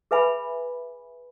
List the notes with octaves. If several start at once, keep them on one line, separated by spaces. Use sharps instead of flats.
G#4 B4 E5 G#5 B5